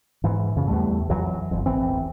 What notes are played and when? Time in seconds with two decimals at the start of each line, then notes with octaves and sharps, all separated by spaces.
0.24 G#2 E3
0.56 F2 C#3
0.68 E2 G#2 G3 A3
1.10 F2 E3 F#3
1.51 G1 F2
1.66 E1 A1 E3 C4